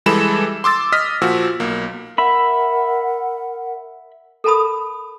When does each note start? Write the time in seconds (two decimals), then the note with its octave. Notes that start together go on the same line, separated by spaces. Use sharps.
0.06 E3 G3 G#3 A4 B5 E7
0.64 C6 D6 E6 A6
0.92 D#5 D#6 F6 B6
1.22 A#2 F3 F#4 E6
1.60 B1 A#3
2.18 A#4 E5 F#5 B5
4.44 A4 A#4 A5 B5 D#6